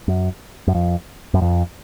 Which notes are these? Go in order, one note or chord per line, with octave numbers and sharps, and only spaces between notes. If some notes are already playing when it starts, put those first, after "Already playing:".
F#2
F#2
F2
F#2
F2